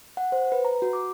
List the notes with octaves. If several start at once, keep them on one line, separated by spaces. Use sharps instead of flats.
F#5
C5
B4
A#5
F#4
D6